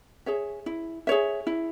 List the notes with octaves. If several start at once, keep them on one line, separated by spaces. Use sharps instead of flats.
G#4 C#5 E5
E4
G#4 C#5 E5
E4